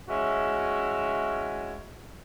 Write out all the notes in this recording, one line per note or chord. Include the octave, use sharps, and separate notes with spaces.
G#3 C#4 E4 F#4 E5